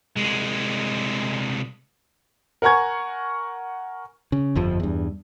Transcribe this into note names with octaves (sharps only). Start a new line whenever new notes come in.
C2 G#3
A#4 F#5 G#5 A#5 C#6 G#6
C#3
G1 F2 F3
E2 G2